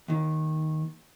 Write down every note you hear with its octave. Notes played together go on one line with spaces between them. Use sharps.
D#2 D#3